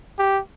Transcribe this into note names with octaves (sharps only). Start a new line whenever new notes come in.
G4